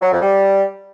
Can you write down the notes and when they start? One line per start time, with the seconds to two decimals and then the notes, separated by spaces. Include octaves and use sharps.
0.02 F#3
0.12 F2
0.22 G3